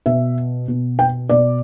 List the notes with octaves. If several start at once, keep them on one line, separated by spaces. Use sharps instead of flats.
B2 E5
B2
G5
B2 D5